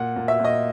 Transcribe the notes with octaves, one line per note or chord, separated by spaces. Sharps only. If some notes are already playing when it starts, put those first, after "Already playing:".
Already playing: A#2 F#5
A#2
E5
A#2 D#5